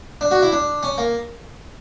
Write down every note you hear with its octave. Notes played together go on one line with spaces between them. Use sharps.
D4
F#4
E4
D4
C#4
A#3